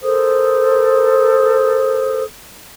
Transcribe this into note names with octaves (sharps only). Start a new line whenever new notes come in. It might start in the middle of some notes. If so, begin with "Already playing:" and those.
A4 A#4 C5 D#6